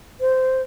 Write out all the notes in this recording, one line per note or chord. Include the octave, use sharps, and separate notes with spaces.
C5